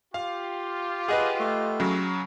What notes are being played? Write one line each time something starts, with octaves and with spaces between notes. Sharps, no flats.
F4 G4 F5
G#4 B4 D#5 F#5
A3
C#3 F#3